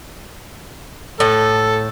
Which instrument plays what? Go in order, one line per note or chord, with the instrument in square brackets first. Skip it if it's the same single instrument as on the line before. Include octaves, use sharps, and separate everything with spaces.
[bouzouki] A2 [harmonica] A4